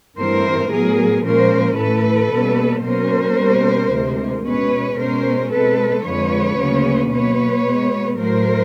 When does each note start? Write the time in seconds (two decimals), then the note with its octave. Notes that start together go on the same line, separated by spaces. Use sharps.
0.18 G2 E3 A3 C4 A#4 C5
0.72 A2 F#3 B3 G#4 A#4
1.25 A#2 F3 G#3 C#4 A#4 C5
1.78 A2 E3 A3 A4 B4
2.32 B2 G3 A#3 C#4
2.85 B2 F#3 A#3 C#4 A#4 C5
3.39 B2 G3 A#3 C#4
3.93 D2 C3 E3 G#3
4.46 B2 G#3 C#4 B4 C#5
4.99 B2 G#3 C#4 A#4 C5
5.52 B2 G#3 C4 A4 B4
6.05 F2 D3 F3 G#3 B4 C#5
6.59 D2 C#3 F#3 A#3 C#4
7.12 B2 F#3 A#3 B4 C#5
7.65 B2 G#3 B3
8.19 A2 F#3 A3 A#4 C5